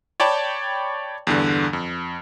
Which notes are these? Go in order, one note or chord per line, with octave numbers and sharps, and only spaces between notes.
C#5 D5 G5 A5 B5
E2 G2 D3
F2